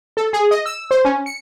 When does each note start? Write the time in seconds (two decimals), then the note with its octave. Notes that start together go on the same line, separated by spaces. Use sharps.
0.17 A4
0.33 G#4
0.51 D#5
0.66 E6
0.91 C5
1.05 C#4
1.26 C#7